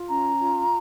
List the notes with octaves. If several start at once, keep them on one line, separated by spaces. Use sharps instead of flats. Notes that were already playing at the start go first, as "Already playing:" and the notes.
Already playing: F4
C#4 A#5
F4